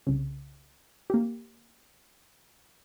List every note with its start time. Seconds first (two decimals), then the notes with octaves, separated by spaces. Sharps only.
0.07 C2 C#3
1.10 A#3 G4